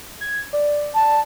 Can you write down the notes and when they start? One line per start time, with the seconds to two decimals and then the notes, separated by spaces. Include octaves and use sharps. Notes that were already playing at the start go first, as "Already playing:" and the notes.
0.21 G#6
0.53 D5
0.95 A5